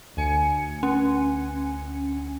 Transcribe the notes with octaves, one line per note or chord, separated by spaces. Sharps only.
D2 G#5 C#7
C#4